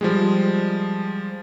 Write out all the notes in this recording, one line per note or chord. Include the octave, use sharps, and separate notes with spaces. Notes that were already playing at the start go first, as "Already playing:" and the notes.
F3 G3 G#3